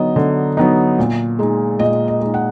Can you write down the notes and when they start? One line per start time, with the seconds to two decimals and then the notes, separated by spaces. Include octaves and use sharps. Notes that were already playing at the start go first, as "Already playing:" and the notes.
Already playing: D3 F#3 B3 D#4 D#5
0.16 D3
0.57 F#3 B3 D#4
0.99 A#2
1.39 G#3 D#4
1.79 A#2 D#5
2.08 D#5
2.20 G#3 D#4
2.34 F#5